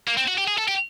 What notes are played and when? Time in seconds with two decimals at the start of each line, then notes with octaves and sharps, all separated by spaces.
0.08 A#3
0.17 C4
0.28 F#4
0.38 G4
0.48 G#4
0.58 A4
0.68 G4